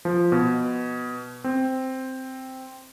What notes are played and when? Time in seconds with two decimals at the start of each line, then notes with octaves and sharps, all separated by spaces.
0.05 F3
0.32 B2
1.44 C4